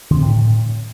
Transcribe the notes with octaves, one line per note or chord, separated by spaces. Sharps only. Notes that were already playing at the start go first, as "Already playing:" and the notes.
D3
C4
A2